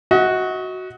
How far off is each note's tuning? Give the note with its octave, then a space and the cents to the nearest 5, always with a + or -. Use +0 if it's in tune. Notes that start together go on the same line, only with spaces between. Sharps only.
F#4 +0 D#5 +40